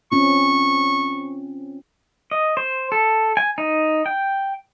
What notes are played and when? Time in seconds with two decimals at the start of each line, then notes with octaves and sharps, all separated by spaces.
0.12 C4 C#4 F4 C#6
2.31 D#5
2.57 C5
2.92 A4
3.37 G#5
3.58 D#4
4.06 G5